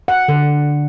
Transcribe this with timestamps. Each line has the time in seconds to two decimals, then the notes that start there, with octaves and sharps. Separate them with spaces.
0.08 F#5
0.28 D3